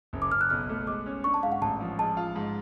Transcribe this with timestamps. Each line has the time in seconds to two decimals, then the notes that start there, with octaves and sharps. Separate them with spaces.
0.13 F#1
0.22 D6
0.32 F#1 F6
0.41 F#6
0.50 B1 F6
0.69 A3
0.87 G#3 D6
1.06 C#4
1.24 D4 C#6
1.34 A5
1.43 G#2 F5
1.52 F#5
1.61 A1 A5
1.80 F3
1.99 G#3 A5
2.17 F4
2.36 G#2